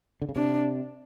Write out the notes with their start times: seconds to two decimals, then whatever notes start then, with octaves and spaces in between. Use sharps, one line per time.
0.22 D3
0.29 C#3
0.36 C3 D4